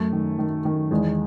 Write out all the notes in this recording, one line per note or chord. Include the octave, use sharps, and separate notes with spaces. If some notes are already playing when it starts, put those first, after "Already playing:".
Already playing: F#2 A3
D#3
D#3
D#3
E2 G#3